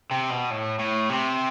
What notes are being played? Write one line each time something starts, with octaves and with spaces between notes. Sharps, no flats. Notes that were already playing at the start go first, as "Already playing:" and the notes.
C3
B2
A2
A2
C3